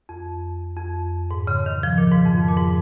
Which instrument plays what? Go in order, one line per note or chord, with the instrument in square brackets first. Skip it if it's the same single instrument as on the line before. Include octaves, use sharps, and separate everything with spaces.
[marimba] F2
F2
G#2
C#3
D#3
F3
A#2
G#2
F2
F2
A#2
G#2